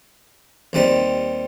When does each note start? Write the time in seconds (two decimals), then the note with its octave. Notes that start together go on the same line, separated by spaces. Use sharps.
0.73 D#2 D#3 G3 C4 D#4